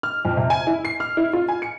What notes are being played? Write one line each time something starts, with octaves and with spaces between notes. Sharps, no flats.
F6
F2
C3
G#5
E4
C7
F6
E4
F4
G#5
C#7